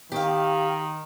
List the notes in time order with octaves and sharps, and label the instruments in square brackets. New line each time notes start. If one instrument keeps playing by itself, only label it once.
[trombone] D#3 [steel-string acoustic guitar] G4 F5